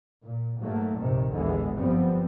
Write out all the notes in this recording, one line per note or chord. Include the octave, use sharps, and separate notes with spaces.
A#2
G#2 F#3 A3 A#3
A#1 G2 C3 D#3
A1 D#2 D3 E3 G#3 B3
G1 F#2 F3 G3 B3 C4